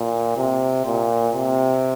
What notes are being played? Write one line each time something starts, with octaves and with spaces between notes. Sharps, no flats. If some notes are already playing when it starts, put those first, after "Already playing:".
Already playing: A#2
C3
A#2
C3